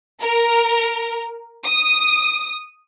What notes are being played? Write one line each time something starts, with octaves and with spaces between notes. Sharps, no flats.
A#4
D#6